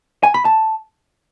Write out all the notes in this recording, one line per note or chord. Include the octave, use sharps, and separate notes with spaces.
G#5
B5
A5